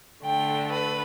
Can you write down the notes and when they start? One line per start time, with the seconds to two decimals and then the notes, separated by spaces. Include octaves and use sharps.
0.24 D3 A3 G5
0.72 B4